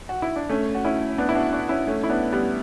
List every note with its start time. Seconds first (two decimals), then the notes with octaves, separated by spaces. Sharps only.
0.09 F#4
0.22 E4
0.36 D4
0.49 A3 C#4
0.75 F#4
0.84 C#4 E4
1.18 B3 D4
1.29 E4
1.35 D4 F#4
1.53 D4 F#4
1.69 C#4 E4
1.87 A3 C#4
2.04 E4
2.09 B3 D4
2.32 G3 B3